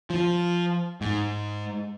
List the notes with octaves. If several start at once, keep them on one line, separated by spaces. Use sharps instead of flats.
F3
G#2